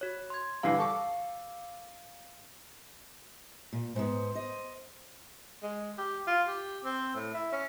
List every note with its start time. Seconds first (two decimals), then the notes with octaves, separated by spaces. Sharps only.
0.01 F#4 C#5
0.30 C6 G#6
0.63 G2 D3 E3 F5 C7
0.78 A4 C#6 D6
3.73 A#2
3.96 G#2 B3 C5
4.35 D#5
5.63 G#3
5.98 G4
6.27 F4
6.48 G4
6.84 C4
7.15 A2
7.34 E4
7.52 C#4